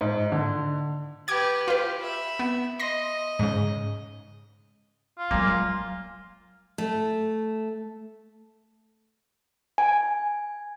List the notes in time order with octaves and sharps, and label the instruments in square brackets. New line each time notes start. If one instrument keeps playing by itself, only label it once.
[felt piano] G#2
D3
[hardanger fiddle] G4 B4 [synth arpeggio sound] D6 G#6
[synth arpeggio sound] F4 B4 [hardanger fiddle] G4
[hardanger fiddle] E5 B5
[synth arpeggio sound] B3
[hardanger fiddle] D#5 [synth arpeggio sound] C6 A#6
[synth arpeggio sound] G#2 C#3
[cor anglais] F4
[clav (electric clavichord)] A#2 A#3 [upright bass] F#3 G#3
[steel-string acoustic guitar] A3
[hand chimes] G#5